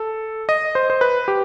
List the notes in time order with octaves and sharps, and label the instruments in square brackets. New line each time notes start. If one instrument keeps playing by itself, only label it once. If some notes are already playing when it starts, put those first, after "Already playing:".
Already playing: [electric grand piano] A4
D#5
C5
C5
B4
G4